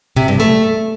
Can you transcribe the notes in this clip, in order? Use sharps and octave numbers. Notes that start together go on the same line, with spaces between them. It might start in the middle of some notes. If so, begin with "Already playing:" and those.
C3
G2
A3